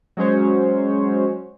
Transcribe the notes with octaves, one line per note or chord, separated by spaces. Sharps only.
F#3 G#3 C#4 C5 C#5